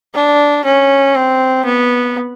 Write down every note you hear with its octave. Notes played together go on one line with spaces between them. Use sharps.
D4
C#4
C4
B3